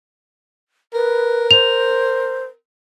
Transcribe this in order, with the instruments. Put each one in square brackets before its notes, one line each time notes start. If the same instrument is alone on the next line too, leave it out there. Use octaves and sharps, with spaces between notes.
[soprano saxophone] A#4 [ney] B4
[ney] C5 [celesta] F7